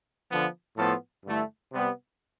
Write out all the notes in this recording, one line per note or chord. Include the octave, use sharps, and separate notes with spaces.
D3 F3 B3
A2 F3 B3 F4 A4
G2 D3 A3 E4
C3 G3 B3